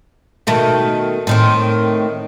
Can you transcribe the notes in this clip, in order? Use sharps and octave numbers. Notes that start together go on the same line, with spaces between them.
B2 D#3 A3
A2 D#3 C4